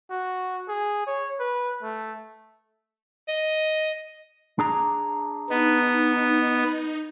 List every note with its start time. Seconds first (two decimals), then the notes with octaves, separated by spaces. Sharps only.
0.11 F#4
0.69 G#4
1.07 C#5
1.40 B4
1.82 A3
3.28 D#5
4.59 D4 G#4 A#5
5.50 B3 D#4